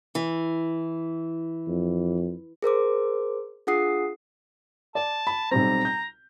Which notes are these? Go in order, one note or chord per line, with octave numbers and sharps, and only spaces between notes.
E3
F2
G#4 A#4 C5 D6
D4 F4 G#4 F#5 D#6 C7
D5 A5
B5
B1 G3 C4 A#5
G6